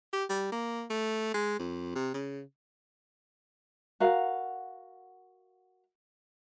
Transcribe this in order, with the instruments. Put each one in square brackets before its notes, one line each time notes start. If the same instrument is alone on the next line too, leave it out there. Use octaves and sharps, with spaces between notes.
[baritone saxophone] G4
G3
A#3
A3
G#3
F2
C3
C#3
[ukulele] F#4 A#4 F5 F#5